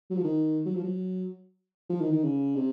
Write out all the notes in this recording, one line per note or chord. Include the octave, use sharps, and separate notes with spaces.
F#3
F3
D#3
F#3
F3
F#3
F3
D#3
D#3
C#3
C3